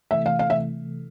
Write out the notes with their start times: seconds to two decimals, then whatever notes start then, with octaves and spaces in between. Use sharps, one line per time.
0.11 C3 E3 A3 E5
0.26 F5
0.39 C3 E3 A3 F5
0.50 E5